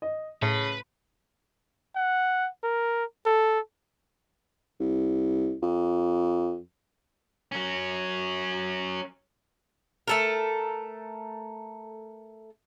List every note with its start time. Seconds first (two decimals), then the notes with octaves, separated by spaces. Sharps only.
0.02 D#5
0.42 A2 C#3 B4 A5
1.96 F#5
2.64 A#4
3.26 A4
4.80 C2
5.62 F2
7.52 F#3 C#4
10.08 A3 A4 A#4